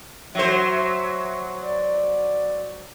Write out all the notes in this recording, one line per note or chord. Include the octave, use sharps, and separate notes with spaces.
F#3 C5 E5
D5